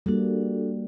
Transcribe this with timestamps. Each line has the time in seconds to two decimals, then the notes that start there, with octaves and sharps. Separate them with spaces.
0.06 G3 A#3 D4 F#4 A4